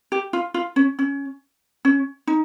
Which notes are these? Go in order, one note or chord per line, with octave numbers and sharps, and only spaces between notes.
G4
F4
F4
C#4
C#4
C#4
D#4